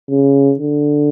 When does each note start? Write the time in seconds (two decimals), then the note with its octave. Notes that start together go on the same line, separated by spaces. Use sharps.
0.10 C#3
0.59 D3